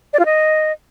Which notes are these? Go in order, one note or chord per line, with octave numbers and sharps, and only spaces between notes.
D5
F4
D#5